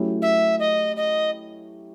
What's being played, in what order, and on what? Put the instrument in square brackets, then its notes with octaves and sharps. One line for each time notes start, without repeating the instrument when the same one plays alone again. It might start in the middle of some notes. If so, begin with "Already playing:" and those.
Already playing: [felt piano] F#3 A3 C#4 E4 G4
[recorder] E5
D#5
D#5